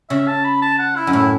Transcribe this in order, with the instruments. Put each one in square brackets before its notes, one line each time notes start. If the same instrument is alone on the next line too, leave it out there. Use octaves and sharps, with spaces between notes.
[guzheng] C#3 [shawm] E5
[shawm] A5
B5
A5
F#5
E4
[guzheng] F#2
[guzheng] A2 [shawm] E4